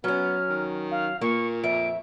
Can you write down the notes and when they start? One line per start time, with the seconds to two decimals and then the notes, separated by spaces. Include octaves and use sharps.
0.04 F#3 B3 C#4 F6
0.49 D#3
0.91 F5
1.21 A#2 A#3 C#6
1.63 F2 E5 D7